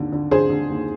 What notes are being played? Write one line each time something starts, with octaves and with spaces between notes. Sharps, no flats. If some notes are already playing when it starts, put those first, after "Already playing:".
Already playing: D#2 D3
D3
D3 G#4 C5
D3
D#2